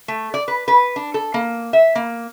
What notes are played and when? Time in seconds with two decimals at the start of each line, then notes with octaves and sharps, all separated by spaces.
0.08 A3
0.34 D5
0.48 B4
0.68 B4
0.96 D4
1.14 A4
1.34 A#3
1.73 E5
1.95 A#3